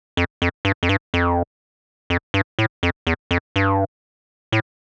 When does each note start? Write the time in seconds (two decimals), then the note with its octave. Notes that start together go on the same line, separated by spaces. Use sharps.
0.17 F2
0.42 F2
0.65 G2
0.83 F2
0.89 G2
1.14 F2
2.10 F2
2.34 G2
2.59 A2
2.83 F2
3.07 E2
3.31 F2
3.56 G2
4.52 A2